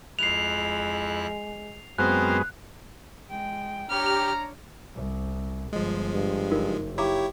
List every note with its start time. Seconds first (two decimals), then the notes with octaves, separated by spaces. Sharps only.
0.19 F2 G#3 E4 F#6 C7 F7
1.98 F#2 G#3 B3 C4 A#4 C5 F5 F#6
3.30 G#3 G5
3.90 D4 G4 C#5 A#5 F6
4.95 C2
5.73 G1 F3 G#3 D#5
6.14 G2
6.51 F#1 D#4 F4 A#4
6.98 E4 G4 C#5 F5 A#5 D6